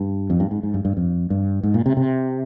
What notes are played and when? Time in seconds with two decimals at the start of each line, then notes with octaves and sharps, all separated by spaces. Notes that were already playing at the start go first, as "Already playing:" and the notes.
Already playing: G2
0.30 F2
0.40 G2
0.51 G#2
0.63 G#2
0.74 G2
0.85 G2
0.97 F2
1.30 G2
1.63 G#2
1.74 A#2
1.86 C3
1.97 C3